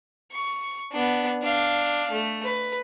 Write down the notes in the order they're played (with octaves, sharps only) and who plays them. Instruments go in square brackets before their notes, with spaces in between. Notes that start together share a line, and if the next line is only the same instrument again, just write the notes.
[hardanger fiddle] C#6
B3 D4
D4 F5
A3
B4